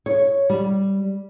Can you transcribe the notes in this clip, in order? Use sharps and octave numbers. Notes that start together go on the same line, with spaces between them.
C#5
G3